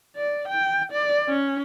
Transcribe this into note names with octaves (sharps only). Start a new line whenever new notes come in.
D5
G5
D5
C#4